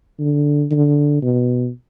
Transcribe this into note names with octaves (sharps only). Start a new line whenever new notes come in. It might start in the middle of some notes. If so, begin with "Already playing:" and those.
D3
D3
B2